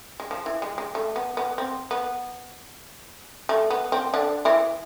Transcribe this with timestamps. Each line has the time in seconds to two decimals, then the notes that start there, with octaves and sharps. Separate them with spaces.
0.20 G#3
0.31 F3
0.46 E3
0.62 G#3
0.78 G#3
0.95 A3
1.16 B3
1.37 B3
1.58 C4
1.91 B3
3.49 A3
3.70 B3
3.92 C4
4.14 D3 D4
4.45 E3 E4